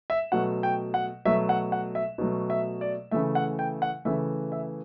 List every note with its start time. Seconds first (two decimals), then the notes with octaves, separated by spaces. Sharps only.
0.10 E5
0.32 B2 F#3 A3 F#5
0.63 G5
0.94 F#5
1.25 B2 F#3 A3 E5
1.49 F#5
1.72 F#5
1.95 E5
2.18 B2 F#3 A3
2.50 E5
2.81 D5
3.11 C#3 E3 A3 E5
3.35 F#5
3.59 G5
3.82 F#5
4.05 C#3 E3 A3 E5
4.52 E5